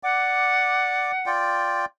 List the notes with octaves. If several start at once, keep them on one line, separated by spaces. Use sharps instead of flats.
D5 F#5 D6
F4 D5 G5